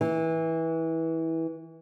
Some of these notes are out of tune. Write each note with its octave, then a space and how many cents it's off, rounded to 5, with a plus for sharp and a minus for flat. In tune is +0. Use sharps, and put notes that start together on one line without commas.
E3 -20